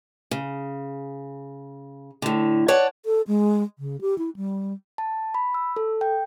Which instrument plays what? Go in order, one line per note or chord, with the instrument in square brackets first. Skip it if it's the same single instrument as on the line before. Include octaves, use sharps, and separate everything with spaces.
[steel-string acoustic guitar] C#3
A2 D3
C#5 D5 F#5 A5
[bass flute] A4
G#3
C#3
G4
E4
G3
[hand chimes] A5
B5
E6
A4
G5